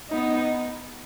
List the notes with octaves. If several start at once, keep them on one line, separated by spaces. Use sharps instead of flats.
B3 D#4